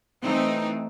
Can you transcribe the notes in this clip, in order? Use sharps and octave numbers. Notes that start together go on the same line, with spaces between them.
E3 A3 C4 D#4